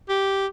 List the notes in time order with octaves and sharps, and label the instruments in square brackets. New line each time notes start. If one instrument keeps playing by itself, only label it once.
[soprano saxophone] G4